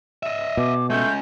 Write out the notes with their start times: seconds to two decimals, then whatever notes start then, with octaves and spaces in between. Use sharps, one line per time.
0.23 D#5 E5
0.57 B2 D6
0.90 G#3 A3 C#4 G6